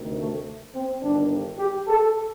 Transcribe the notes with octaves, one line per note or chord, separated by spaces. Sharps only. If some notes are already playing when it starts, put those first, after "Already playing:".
Already playing: D2 C3 D#3
A3
C4
G1 G2 D#3 D4
G4
A4